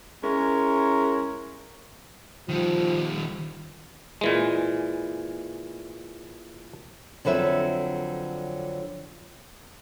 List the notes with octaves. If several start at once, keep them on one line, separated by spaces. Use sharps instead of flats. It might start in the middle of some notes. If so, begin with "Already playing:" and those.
G#3 C#4 E4 A#4
D#3 F3 G3
A#2 E3 G#3
F2 D3 F#3 B4 E5